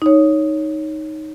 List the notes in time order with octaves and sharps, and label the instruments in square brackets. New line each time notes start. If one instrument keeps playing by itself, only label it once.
[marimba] D#4 C#5